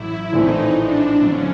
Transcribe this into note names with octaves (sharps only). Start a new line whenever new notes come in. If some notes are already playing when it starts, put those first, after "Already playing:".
Already playing: A1 A2 F#3 E4
A#1 A2 E3 A3 C4 D#4
D4
F2 D3 F#3 C#4